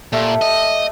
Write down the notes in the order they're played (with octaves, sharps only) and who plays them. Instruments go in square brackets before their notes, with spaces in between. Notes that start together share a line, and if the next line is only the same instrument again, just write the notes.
[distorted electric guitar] A#2 [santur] A3 G4
[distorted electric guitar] D#5